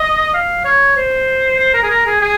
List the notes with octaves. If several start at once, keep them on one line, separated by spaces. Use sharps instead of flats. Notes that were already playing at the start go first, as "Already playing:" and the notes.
Already playing: D#5
F5
C#5
C5
C5
A#4
G#4
A#4
G#4
G#4